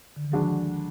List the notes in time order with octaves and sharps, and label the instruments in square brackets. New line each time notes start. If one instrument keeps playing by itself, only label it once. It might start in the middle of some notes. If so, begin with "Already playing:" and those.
[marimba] D3
D#3
[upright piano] D2 D3 G#3 D4 F#4 [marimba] F3